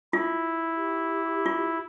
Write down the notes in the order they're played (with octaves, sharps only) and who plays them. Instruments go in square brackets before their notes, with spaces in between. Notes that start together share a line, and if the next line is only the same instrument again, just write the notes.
[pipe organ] E4 [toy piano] F4
[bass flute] G4
[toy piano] F4